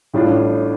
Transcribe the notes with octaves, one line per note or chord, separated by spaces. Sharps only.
A1 A2 G3 D4 F4